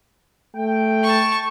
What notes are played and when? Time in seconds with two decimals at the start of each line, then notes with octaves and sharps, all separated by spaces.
0.56 A3 G5
1.04 A5 C#6